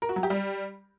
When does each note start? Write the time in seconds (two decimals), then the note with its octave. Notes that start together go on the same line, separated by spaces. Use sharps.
0.02 A#4
0.09 F#4
0.16 F#3
0.23 G4
0.30 G3